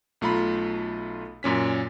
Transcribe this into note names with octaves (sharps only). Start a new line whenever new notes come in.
B1 A3 F4 A#5 B5
F#2 A#2 C#4 B6